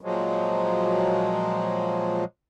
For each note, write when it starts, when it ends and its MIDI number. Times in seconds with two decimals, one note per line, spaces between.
0.01 2.25 46
0.01 2.25 53
0.01 2.25 54
0.01 2.25 56